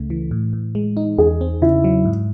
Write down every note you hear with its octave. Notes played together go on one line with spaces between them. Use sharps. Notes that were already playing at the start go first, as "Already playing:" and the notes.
Already playing: C#2 C#3 A3
E3
A2
A2
G#3
D#4
E2 G#4
C4
C#3 E4
F#3
G#2